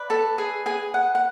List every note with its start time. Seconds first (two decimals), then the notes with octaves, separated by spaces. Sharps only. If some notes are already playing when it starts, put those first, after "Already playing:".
Already playing: B4 D5
0.10 A4 A5
0.38 G#4 G#5
0.66 G#4 G#5
0.94 F#5
1.15 F#5